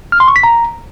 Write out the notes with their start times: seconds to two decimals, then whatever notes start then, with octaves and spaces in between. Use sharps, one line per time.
0.12 F6
0.20 C6
0.28 C#6
0.36 B6
0.43 A#5